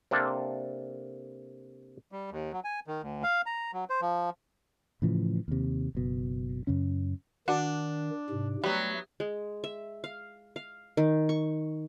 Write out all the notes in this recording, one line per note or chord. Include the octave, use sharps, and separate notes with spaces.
C3 A#3 D4 A4
G3
D#2
F#3
G#5
D#3
D2
F5
A#5
F#3
C5
F3
A2 C#3 E3 F3
D#2 C3
F#1 B2
F#2 C#3 C#4
D#3 D4 F#4
G#2 C3
F#3 G3 A3 B3
G#3
E5
F5
F5
D#3
C#6